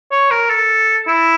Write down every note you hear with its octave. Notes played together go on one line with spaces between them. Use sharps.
C#5
A#4
A4
E4